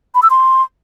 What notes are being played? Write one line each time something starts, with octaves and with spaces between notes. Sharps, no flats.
B5
E6
C6